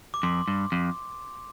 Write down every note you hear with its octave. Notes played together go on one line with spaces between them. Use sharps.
D6
F2 C6
G2
F2